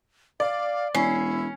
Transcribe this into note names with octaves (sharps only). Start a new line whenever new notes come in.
D5 F5
E1 C#4 E4 C7